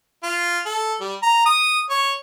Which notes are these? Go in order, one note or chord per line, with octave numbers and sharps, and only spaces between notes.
F4
A4
G3
A#5
D#6
C#5